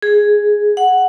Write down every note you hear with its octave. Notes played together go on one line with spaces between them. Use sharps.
G#4
F#5